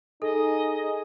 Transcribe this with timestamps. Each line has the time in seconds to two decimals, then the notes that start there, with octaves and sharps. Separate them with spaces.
0.22 D#4 G#4 A4 D#5